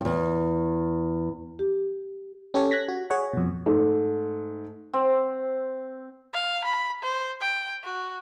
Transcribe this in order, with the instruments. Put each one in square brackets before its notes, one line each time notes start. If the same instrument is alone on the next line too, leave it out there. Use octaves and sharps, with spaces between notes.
[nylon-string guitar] E2 G2
[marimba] G4
[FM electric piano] C#4 G4 A4 C#5
F#6 G#6 A#6 B6
F#4
G#4 C#5 F#5
F2 B2
[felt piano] G#2 A3
[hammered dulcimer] C4
[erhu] F5
B5
C5
G5
F#4